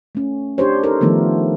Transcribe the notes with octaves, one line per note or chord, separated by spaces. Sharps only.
A3 C#4
D4 G4 C5 C#5
D#4 A4 A#4 C5
D#3 F3 A3 B3 D#4